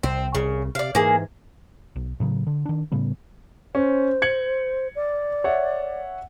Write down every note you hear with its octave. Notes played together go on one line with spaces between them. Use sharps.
C2 C4
C2 C#3
C3 D5 F5
G#2 E3 A#3 G#4
B1
A2 C#3 F#3
D3
D#3 D4
A2 C#3 G3 B3
C#4 C5
G#6 C#7 F#7
D5
C#5 E5 F#5